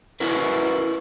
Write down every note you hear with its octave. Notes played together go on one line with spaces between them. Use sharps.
C#4 E4 F#4 A#4 B4